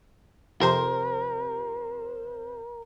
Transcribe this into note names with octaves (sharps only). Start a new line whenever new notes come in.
F2 C3 A#4 C5